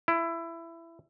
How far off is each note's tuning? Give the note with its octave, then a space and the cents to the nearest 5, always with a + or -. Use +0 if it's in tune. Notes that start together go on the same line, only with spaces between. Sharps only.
E4 +20